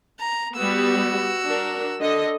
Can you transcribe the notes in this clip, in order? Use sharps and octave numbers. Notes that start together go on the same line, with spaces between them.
A#5
G3 B3 F#4 E6
D4 A#4
D3 A4 D#5